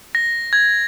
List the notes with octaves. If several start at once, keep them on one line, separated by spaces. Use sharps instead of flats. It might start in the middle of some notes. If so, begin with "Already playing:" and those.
A#6
G#6